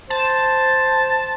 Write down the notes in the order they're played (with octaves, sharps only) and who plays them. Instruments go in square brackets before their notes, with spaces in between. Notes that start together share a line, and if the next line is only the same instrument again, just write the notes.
[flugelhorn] C5 [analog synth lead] A5